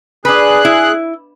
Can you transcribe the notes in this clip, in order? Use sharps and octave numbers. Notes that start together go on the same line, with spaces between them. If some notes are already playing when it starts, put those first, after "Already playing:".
D4 G#4 B4 F#6
E4